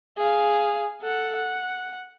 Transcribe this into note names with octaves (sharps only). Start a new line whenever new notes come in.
G#4 F5
A4 F#5
F#5